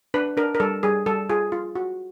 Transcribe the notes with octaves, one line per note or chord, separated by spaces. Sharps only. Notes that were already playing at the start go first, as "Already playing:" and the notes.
D4 B4
D4 A#4
A#4
G3 A4
G3 G#4
G3 A4
F4 G#4
F4
F#4